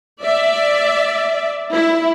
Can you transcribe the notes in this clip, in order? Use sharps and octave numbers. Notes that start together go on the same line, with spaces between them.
D5 E5
E4